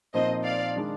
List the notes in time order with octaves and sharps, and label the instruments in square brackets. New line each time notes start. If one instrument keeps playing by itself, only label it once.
[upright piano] A#2 F3 C4 D#4 [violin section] C5 D#5
[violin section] D5 F5
[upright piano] D#3 G#3 D4